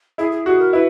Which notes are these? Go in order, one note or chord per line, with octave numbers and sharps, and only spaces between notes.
E4 G#4
G#4
F#4 G#4
A#4
E4 B4